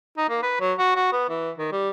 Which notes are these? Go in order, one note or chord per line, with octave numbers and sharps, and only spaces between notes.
D#4
A#3
B4
F#3
F#4
F#4
B3
E3
D#3
G3